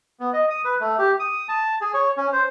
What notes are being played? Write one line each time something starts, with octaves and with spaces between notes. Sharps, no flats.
B3
D#5
D#6
B4
A3
G4
D#6
A5
G#4
C#5
C#4
C5